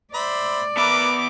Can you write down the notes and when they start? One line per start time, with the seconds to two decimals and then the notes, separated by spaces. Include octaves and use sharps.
0.14 C5 D5 E5 B5
0.77 B3 A#4 B4 E5 D6